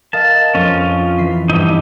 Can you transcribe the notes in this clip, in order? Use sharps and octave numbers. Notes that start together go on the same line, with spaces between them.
A#4 D#5 F5 A5
F2 C#4 F4
E3 B6 C7
E2 G2 D#4 E4 G4